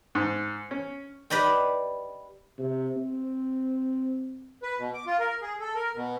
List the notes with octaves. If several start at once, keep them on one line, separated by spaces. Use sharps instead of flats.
G#2
C#4
G4 B4 D5 D#5 G5
C3
C4
B4
B2
D6
F4
A#4
G#4
A4
A#4
B2